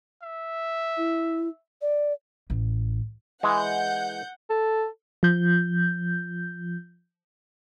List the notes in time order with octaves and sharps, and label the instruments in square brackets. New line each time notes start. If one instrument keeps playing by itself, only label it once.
[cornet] E5
[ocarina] E4
D5
[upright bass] A1
[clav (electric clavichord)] E3 G#3 [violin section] F#5 G6
[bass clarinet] A4
[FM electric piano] F3 G6